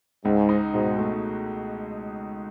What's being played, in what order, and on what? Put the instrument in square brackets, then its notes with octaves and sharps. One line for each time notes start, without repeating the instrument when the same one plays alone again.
[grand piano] C#2 [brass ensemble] G#2
[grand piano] D#4
[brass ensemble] G#2 [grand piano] B2
[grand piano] A3